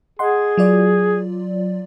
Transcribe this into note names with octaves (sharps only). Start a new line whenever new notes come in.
G#4 D#5 F#5 C6
F#3 F4 D5